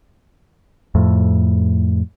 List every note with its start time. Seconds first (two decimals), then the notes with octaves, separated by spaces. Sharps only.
0.95 F2 A2